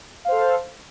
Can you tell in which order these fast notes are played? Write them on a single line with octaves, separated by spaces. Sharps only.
F5 C5 A4